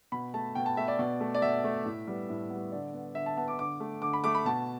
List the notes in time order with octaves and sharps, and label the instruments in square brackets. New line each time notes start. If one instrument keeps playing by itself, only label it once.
[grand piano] B2 B5
A3 A5
B2 G5
A5
A3 E5
D5
B2
A3
D5
B2 E5
A3
A2
G3 B3
A2
G3 B3
D3 D5
B3
D3 E5
A5
B3 A5
D6
D3 D6
A3
D3 D6
B5
A3 D6
B5
B2 A5